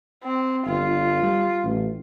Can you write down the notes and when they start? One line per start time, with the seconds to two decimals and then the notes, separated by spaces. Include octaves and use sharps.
0.24 C4
0.66 G1 F4
1.23 G3
1.64 A1